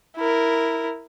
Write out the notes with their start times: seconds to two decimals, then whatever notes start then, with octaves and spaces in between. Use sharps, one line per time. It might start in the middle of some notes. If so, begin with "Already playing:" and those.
0.16 E4 A#4